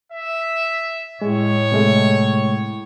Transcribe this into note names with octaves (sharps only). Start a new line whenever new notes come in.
E5
A2 G#3 C#5
C3 G#3 A3